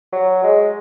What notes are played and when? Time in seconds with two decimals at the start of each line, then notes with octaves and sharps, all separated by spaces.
0.13 F#3
0.44 G#3